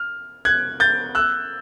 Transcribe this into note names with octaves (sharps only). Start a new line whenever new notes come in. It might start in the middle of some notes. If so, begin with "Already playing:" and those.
Already playing: F6
F#6 G#6
G6 A6
E6 F#6